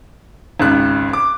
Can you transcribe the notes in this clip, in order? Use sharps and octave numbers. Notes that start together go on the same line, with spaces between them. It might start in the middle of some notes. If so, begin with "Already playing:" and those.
G#1 C#2 C#3 F#6
D6